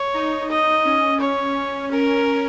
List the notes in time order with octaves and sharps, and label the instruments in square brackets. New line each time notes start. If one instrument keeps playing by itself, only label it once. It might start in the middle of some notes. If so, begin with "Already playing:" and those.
Already playing: [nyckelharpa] C#5
[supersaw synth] D#4
[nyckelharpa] D#5
[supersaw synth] C#4
[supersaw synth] C#4 [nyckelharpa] C#5
[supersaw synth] C#4 [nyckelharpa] A#4